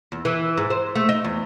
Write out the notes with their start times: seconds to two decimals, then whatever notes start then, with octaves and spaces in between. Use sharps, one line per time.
0.12 E2
0.25 E3
0.58 G#2
0.70 C5
0.95 A3
1.09 D#4
1.24 E2